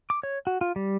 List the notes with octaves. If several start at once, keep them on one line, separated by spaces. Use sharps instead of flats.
D6
C#5
F#4
F4
G3